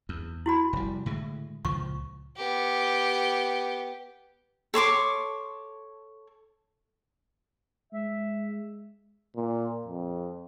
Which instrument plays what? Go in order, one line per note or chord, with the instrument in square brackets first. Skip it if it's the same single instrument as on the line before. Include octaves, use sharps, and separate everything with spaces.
[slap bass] E2
[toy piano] E4 F#4 B5
[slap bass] F1 G3
A2 D3 G#3
[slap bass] C#2 A#2 F3 [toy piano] C#6
[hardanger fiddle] B3 G4
[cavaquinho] A4 C#5 C6 D6
[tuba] G#3 [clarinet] E5
[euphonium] A#2
F2